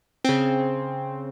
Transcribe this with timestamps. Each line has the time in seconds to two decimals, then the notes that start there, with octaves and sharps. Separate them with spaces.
0.25 C#3 C4